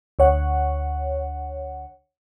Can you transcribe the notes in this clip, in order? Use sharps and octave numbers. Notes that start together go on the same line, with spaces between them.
D2 C#5 F#5